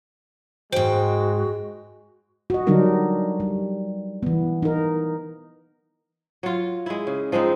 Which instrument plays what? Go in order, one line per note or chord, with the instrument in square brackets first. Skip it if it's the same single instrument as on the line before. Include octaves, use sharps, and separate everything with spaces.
[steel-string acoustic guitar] G#2 G5 [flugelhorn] G#3 [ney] F#4 [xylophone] C5
[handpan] F#4 D#5
D3 F#3 G3 D4 D#4 A#4
G3
E3 B3
D#4 A#4
[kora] F#3 F4
G#3 E4
C#3
F3 G#3 C4 D#4